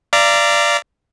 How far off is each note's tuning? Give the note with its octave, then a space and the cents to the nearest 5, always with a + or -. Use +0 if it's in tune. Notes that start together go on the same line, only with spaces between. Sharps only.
D5 +0 F5 -35 A#5 +0